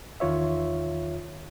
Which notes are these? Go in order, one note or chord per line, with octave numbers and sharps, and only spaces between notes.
E2 D#3 F4 C#5 E5